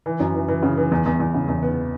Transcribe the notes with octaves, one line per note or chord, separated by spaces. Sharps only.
E3
F#2
E3
E3
C#3
E3
E2
E2
E2
C#3
E2
B3